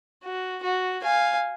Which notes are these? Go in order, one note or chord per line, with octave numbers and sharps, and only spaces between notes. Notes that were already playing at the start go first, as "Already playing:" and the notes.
F#4
F#4
F5 G#5